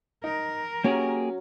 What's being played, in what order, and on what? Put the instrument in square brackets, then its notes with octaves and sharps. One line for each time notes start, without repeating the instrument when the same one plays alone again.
[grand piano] D#4 [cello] A#4
[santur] F#3 [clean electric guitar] A#3 G4 G#4 [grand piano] C#4